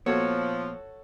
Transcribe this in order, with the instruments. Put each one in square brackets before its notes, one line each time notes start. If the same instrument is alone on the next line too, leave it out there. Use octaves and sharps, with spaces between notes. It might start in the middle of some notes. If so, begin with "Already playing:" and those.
[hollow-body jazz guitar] A#2 B3 [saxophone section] F3 [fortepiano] F#4 A4 F#5 [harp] C#5